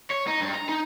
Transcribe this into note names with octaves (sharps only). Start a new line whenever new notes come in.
C#5
D#4
G2
A#5
D#4